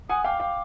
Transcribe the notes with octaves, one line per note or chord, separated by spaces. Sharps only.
F#5 G#5 D#6
F5 G5 D6
F5 G5